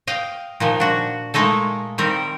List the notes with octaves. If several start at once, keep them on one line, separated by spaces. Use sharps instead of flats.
D#5 F5 G5
A#2 D#3 F3
D4 F#4
A#2 G#3 A3 D#4 A4
D#3 G3 C4 A#4